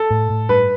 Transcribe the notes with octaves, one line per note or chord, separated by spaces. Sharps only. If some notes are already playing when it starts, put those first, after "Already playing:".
Already playing: A4
A2
A2
G2 B4